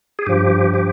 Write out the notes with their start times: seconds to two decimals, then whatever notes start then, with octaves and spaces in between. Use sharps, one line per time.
0.19 G#4
0.26 G2 F3 G4
0.74 G4